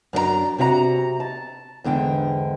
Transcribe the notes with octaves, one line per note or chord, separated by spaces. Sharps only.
F#2 D4 A4 A#5
C3 F#4 F5 A#5
A5
E2 G#2 D3 G5